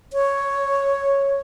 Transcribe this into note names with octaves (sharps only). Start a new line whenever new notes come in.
C#5